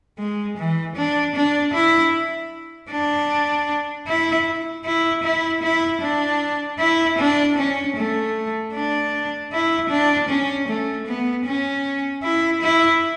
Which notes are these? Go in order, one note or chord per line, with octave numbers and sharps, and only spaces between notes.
G#3
E3
D4
D4
E4
D4
E4
E4
E4
E4
D4
E4
D4
C#4
A3
D4
E4
D4
C#4
A3
B3
C#4
E4
E4